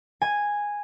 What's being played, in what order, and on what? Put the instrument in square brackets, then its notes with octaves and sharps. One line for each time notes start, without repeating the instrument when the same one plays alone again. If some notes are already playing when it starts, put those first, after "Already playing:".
[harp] G#5